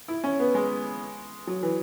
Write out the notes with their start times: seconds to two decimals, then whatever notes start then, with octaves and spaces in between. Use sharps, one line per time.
0.08 E4
0.24 C#4
0.40 B3
0.55 G#3
1.47 F#3
1.63 E3